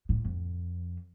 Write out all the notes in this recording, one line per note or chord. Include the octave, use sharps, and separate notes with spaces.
A2
F2